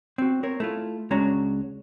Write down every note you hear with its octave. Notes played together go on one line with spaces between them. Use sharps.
C4 F#4
C4 A#4 C#5
A3 E4 F4
C#2 G#3 C#4 D4 F#4 A#5